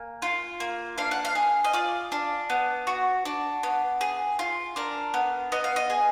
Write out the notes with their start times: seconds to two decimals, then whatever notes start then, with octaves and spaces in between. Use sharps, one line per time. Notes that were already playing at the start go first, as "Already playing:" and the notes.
Already playing: A#3 G#5
0.22 F4
0.60 A#3
0.98 D4 F5
1.11 F#5
1.25 F5
1.35 G#4
1.65 D#5
1.73 F4 D5
2.12 D4
2.50 B3
2.87 F#4
3.25 D4
3.63 B3
4.01 G#4
4.39 F4
4.76 D4 A#4
5.14 B3
5.52 B3 D#5
5.64 F5
5.76 D#5
5.90 G#4